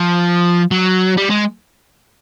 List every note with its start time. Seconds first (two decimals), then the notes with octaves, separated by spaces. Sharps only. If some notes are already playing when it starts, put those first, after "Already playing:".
Already playing: F3
0.71 F#3
1.17 G3
1.30 G#3